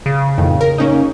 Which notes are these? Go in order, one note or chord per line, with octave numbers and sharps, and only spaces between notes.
C#3
F2 A2 D#3
A#4
A#3 C#4 D#4